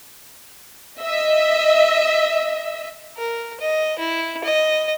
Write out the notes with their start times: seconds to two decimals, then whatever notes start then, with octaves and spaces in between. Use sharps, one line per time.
1.01 D#5 E5
3.17 A#4
3.60 D#5
3.99 E4
4.44 D#5